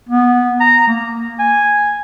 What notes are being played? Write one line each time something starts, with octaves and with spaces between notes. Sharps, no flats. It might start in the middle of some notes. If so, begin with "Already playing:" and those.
B3
A#5
A#3
G#5